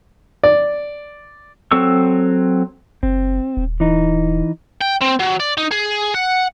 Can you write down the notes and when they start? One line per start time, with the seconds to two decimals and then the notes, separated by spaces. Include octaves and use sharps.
0.44 D5
1.71 F#3 C4 A4 C#6 E6
3.03 F#1 C4
3.57 D#1
3.80 E3 D#4
4.81 G5
5.01 C4
5.20 F#3
5.40 D5
5.58 D#4
5.72 G#4
6.14 F#5